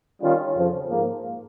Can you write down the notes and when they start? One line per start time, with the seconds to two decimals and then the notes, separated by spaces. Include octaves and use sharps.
0.22 D#3 G3 C#4 F4
0.55 F2 C#3 F3
0.89 G#2 F3 A#3